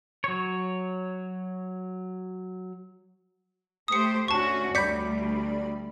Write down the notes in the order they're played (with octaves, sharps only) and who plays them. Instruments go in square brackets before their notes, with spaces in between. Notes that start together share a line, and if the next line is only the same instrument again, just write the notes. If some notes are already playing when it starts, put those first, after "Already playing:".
[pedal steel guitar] F#3 C#5
[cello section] A3 G4 C5 [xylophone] D#6 C#7
[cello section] D2 C#4 F#4 [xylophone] A5 C#6
[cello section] D2 G3 [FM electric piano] D5 B5 [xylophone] G6 B6 C#7